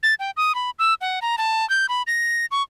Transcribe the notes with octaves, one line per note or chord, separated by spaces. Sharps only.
A6
G5
D#6
B5
E6
F#5
A#5
A5
G6
B5
A#6
C#6